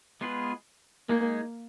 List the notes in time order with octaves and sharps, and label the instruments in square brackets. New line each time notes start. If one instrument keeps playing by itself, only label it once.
[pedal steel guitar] G#3 B3 F4 G#4 B4
[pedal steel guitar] G#3 D#4 G#4 [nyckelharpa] A#3